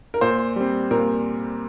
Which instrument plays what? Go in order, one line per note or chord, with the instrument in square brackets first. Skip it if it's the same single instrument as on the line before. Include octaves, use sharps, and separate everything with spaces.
[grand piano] A#4
[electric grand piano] A#2 [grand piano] C5
[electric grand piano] G3 C4
[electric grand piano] A#2 [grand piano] A#4